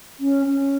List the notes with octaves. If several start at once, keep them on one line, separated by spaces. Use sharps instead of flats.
C#4
C#4